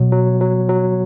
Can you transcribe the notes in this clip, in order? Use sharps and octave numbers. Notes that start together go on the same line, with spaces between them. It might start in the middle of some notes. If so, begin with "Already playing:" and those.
Already playing: B2 F#3
F#3
F#3
F#3